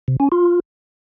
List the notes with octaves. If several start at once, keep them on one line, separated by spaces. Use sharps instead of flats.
C3
C#4
F4